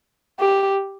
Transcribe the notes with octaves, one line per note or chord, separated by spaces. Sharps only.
G4